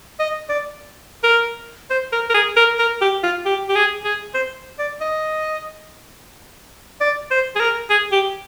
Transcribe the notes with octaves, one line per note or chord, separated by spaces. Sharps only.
D#5
D5
A#4
C5
A#4
A#4
G#4
A#4
A#4
G4
F4
G4
G4
G#4
G#4
C5
D5
D#5
D5
C5
G#4
A#4
G#4
G4